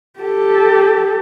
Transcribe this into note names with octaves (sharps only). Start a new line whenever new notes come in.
G4 A4